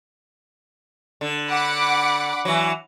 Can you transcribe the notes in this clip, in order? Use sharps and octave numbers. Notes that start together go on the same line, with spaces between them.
D3
F#5 B5 D6
E3 F#3